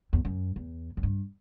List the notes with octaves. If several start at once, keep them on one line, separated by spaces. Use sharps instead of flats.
E2
F#2
E2
F#2
G2